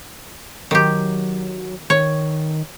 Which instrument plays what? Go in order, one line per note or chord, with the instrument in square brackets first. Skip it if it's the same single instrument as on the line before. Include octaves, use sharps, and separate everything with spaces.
[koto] D#3 G4 [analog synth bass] F#3
[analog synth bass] D#3 [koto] C#5